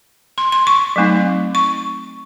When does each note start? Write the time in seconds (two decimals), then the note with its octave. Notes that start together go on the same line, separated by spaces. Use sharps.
0.38 C6
0.52 C6
0.67 C#6
0.96 F#3 A3 C4 D#4
1.55 C#6